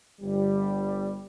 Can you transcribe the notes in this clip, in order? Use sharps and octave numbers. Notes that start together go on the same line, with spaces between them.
G1 G3